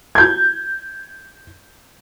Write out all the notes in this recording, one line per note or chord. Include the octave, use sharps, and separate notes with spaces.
G6 G#6